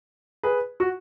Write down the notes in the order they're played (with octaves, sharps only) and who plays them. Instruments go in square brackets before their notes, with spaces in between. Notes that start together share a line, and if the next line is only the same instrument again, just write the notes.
[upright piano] G#4 B4
F#4